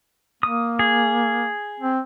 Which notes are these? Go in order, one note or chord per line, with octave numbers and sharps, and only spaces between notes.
A#3 D#6
G#4
C4